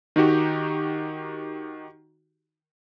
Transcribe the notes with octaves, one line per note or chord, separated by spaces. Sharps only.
D#3 D#4 F#4 G4